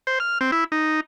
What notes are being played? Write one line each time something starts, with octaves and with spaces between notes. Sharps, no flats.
C5
F6
C4
E4
D#4